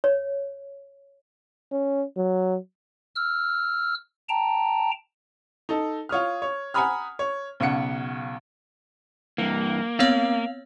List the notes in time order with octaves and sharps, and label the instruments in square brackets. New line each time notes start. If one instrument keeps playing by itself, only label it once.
[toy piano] C#5
[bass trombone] C#4
F#3
[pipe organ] E6 F6
G5 A5 A#5
[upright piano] D#4 A4
F4 C#5 D#6 F6
C#5
F#5 G#5 A#5 B5 D#6 F6
C#5
B1 C#3 F#5 C#7
[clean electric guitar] G2 E3 [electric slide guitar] A#3
[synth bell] B3 C4 C#5 [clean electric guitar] F5